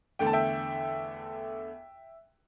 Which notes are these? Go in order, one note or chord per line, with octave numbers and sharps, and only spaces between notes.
E2 D3 A3 G5
A5
E5 G5